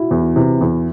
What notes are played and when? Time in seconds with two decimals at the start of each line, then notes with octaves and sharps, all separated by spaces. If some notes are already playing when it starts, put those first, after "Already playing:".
Already playing: E4 F#4
0.11 E2
0.36 C3 E3
0.61 E2